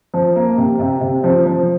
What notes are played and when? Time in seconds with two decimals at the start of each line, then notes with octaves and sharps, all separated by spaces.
0.14 F3
0.36 A#3
0.57 C3
0.80 C3
1.01 C3
1.24 F3
1.46 F3